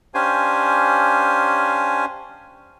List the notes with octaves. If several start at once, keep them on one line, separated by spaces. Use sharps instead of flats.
C#4 D4 G4 C5 F5 G#5